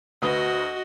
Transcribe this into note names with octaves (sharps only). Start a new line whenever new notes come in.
D2 F#4 B4 D#5 D#6